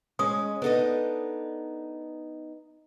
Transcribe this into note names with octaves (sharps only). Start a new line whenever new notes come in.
G#3 C#4 D#6
B3 D4 D#4 A4 D#5